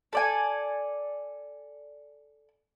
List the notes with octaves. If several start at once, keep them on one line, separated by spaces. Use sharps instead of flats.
A4 D5 G#5